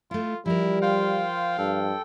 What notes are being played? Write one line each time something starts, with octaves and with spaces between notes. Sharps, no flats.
A3 E4 F4
F3 G3 E4 A#4
F4 C5 F5 G5
G2 A4 G5